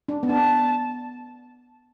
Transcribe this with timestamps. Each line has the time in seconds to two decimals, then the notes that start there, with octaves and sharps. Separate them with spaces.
0.08 D4
0.23 B3
0.29 D4 A5